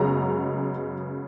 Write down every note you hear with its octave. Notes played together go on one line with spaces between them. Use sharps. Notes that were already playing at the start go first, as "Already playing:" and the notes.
Already playing: F#2 C#3 G#3 B3 A#5